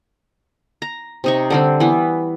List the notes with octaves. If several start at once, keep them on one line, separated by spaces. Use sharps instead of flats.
A#5
C3 D#4 C#6
D3 G3 C4
E3 B3